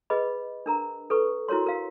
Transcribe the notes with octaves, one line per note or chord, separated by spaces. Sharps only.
G#4 B4 D#5 B5
D4 A#4 A#5
A4 B4 C#6
E4 F#4 A#4 C#5 C6
A#4 F5